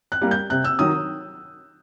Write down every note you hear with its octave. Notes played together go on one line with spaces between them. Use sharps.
F#6
G3 A#3
G6
C3 F#6
E6
D#3 F#3 D#6